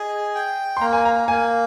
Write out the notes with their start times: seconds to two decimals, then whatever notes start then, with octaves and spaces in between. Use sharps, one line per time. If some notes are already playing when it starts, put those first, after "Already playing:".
Already playing: G#4 D#5
0.35 G5
0.77 C6
0.81 A#3 A#5
0.93 G#5
1.05 A#5
1.28 A#3 G#5